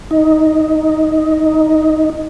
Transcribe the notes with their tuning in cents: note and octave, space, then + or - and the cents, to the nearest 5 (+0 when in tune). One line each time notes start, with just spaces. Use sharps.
D#4 +10